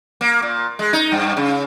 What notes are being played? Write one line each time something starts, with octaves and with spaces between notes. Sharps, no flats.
A#3
A#2
G#3
D#4
G2
C#3